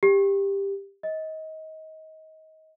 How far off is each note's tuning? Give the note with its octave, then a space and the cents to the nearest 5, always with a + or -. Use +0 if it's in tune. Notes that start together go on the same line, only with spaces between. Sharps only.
G4 +15
D#5 +25